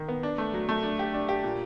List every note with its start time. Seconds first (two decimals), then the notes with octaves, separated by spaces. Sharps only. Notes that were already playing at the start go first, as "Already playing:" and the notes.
Already playing: D#3
0.09 B3
0.23 D4
0.38 A3
0.54 F#3
0.69 A3
0.83 D4
0.99 G4
1.14 D4
1.29 G4
1.43 A#2